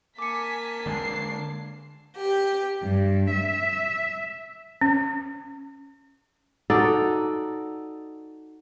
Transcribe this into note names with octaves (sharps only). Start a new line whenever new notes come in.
A#3 G#5 A5 D6 B6 C#7
D3 G#3 D4 C7
G4
G2
E5
C#4
D#4 F#4 A4 D5